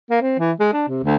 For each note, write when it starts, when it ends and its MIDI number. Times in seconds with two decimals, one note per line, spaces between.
0.10 0.20 58
0.22 0.34 60
0.39 0.52 52
0.60 0.68 56
0.73 0.84 62
0.88 1.01 48
1.04 1.16 38